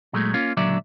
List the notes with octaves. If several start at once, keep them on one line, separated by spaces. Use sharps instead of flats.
A#2 F#3 G#3 A3
A#3 C#4 F4
C#2 A#2 D3 F#3 D5 E5